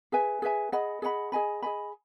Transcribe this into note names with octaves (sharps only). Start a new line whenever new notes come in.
G#4 B4 E5 G#5
G#4 B4 E5 G#5
G#4 D#5 F#5 B5
G#4 D#5 F#5 B5
G#4 D#5 G#5 B5
G#4 D#5 G#5 B5